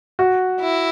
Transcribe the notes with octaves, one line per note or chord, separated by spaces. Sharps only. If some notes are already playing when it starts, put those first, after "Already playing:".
F#4
E4